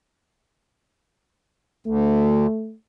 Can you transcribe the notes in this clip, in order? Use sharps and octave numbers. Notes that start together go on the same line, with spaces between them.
D2 A3